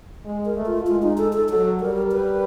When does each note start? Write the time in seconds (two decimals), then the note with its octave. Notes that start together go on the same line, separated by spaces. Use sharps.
0.25 G#3
0.46 A#4
0.56 A3
0.66 F4
0.86 G#3 F4
1.02 D#4
1.18 A4
1.33 A4
1.49 F#3 A4
1.80 G3 A#4
2.12 B4